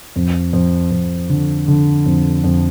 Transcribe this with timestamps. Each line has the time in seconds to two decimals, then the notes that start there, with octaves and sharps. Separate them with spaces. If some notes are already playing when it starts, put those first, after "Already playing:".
0.16 F2
0.53 F2
0.92 F2
1.29 D3
1.68 D3
2.06 F2
2.44 F2